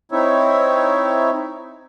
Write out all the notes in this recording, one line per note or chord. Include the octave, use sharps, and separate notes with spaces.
C4 D#4 E4 C#5 E5